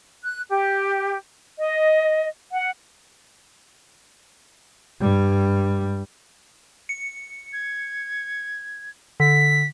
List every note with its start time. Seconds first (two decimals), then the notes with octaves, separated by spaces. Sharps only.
0.23 F#6
0.50 G4
1.59 D#5
2.53 F#5
5.00 G2 G3
6.89 C#7
7.53 G#6
9.20 D3 B6